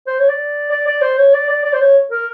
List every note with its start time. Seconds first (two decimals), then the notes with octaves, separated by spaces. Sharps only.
0.07 C5
0.19 C#5
0.29 D5
0.71 D5
0.87 D5
1.01 C5
1.18 C#5
1.34 D5
1.49 D5
1.64 D5
1.73 C5
1.81 C#5
2.11 A#4